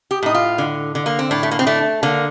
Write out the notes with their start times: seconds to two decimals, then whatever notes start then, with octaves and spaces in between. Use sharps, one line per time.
0.11 G4
0.23 A2 D#4
0.34 F4
0.58 D3
0.95 D3
1.06 A#3
1.19 C4
1.31 A2 D4
1.43 A3
1.51 A#3
1.59 C4
1.67 A3 D4
2.03 D3 A#3